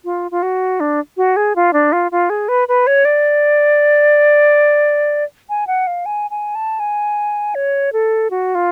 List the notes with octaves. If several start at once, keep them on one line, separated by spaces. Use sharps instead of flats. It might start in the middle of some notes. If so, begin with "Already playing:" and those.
F4
F4
F#4
D4
F#4
G#4
F4
D4
F4
F4
G#4
B4
B4
C#5
D5
G#5
F#5
F5
G#5
G#5
A5
G#5
C#5
A4
F#4
F4